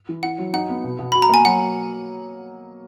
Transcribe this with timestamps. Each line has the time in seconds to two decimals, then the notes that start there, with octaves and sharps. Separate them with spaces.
0.09 E3
0.23 E4 F#5
0.38 F#3
0.53 D#4 F#5
0.69 B3
0.84 B2
0.99 B2
1.12 F#4 B5
1.22 A#5
1.29 A#3 G#5
1.45 F#3 F#5